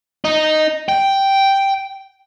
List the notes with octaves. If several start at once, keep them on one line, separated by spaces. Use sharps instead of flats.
D#4
G5